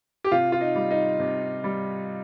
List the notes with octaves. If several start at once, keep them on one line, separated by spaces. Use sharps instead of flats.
G4
C3 F4
F4
D#4
G3
D#4
C3
G3